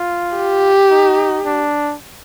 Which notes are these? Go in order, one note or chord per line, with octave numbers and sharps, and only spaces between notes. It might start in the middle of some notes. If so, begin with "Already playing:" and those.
Already playing: F4
G4
D#4
D4